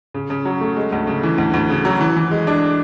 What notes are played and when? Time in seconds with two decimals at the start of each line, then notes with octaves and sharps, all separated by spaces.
0.14 C#3
0.30 C#3
0.45 F#3
0.61 A3
0.76 G#3
0.92 D2
1.07 C#3
1.23 E3
1.38 D2
1.54 D2
1.69 C#3
1.85 F#3
2.01 E3
2.17 E3
2.31 G#3
2.47 D4